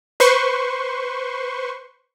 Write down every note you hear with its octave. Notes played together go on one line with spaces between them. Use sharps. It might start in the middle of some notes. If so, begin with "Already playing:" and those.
B4 C5 C6 C#6